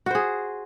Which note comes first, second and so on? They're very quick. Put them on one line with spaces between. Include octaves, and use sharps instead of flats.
F#4 C5 G#4